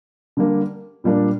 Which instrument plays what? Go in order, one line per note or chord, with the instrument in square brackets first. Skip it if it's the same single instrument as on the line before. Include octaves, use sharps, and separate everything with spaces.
[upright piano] D3 G3 A#3 D4
A#2 G3 A#3 D4